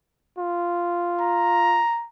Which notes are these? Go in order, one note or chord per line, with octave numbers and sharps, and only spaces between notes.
F4
A#5